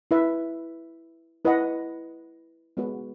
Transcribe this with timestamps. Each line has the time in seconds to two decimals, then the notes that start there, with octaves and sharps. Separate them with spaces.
0.11 E4 B4 E5
1.45 E4 B4 D#5 F#5
2.77 G#3 B3 F#4 B4